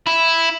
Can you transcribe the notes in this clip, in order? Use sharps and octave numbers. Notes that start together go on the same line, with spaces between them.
E4